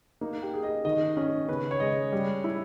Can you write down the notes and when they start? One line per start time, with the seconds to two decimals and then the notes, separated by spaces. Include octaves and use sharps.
0.21 A#3 D#4
0.43 G4
0.53 G#4
0.63 D#5
0.85 D#3 D#5
1.17 C#4 D#5
1.49 C#3 B4
1.71 C#5
1.80 G#3 D#5
2.12 G3
2.44 E4